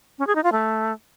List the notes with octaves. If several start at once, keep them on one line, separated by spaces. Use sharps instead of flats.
C#4
G#4
D#4
F4
A3